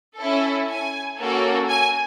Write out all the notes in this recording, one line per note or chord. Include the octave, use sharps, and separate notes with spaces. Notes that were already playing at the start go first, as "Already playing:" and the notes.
C#4 E4 A4
G#5
A#3 C#4 F#4 A4
G#5